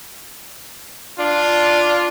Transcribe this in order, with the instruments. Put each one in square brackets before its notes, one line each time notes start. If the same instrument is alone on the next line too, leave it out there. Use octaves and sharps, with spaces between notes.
[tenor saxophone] D4 [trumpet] F4